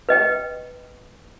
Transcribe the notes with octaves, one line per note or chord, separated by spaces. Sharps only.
B4 D#5 G5